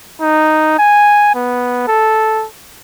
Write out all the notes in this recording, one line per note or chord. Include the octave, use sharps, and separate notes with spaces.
D#4
G#5
B3
A4